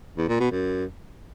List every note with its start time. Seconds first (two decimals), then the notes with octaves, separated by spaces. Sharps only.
0.18 E2
0.29 A#2
0.40 B2
0.51 F#2